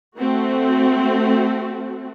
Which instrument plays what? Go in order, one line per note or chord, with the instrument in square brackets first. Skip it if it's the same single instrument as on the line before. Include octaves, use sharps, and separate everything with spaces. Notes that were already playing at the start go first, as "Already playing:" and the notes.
[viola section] A3 C4 F#4